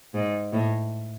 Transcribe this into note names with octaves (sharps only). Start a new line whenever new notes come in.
G#2
A2